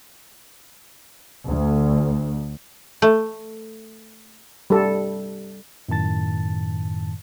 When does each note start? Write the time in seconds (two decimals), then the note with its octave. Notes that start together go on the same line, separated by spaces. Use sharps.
1.48 D2
3.02 A3
4.70 G3 A4
5.89 F#2 A2 D#3 A5 A6